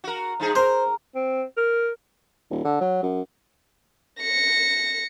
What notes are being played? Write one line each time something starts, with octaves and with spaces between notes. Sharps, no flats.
F#4 A#4
G2 D#4 G#4
A#4 C5
C4
A#4
D#1
D3
F#3
F#2
A#6 C#7